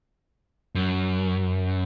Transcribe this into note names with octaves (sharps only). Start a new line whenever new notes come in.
F#2